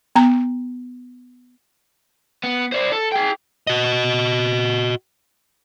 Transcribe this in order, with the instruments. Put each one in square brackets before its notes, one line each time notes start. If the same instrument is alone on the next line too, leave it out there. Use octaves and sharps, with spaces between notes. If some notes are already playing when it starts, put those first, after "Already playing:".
[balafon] B3 A#5
[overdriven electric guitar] B3
C5 D5
A4
G#4 G5
[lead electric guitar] F#4 D#5